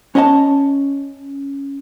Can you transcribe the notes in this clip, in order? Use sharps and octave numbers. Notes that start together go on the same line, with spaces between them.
C#4 C#5 D#5 F#5 A5